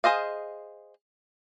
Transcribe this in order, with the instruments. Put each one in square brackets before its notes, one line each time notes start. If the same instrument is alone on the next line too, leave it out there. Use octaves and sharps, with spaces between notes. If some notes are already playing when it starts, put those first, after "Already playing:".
[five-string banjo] G#4 C5 D#5 F5